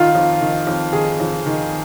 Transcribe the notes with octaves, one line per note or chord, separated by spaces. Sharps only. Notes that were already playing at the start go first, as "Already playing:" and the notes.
Already playing: D#3 F4
F2
D#3
F2
D#3 G#4
F2
D#3